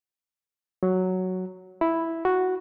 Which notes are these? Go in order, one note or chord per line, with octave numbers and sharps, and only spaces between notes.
F#3
E4
F#4